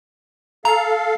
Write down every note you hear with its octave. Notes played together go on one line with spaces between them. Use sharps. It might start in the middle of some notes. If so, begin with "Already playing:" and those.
A4 F5 A#5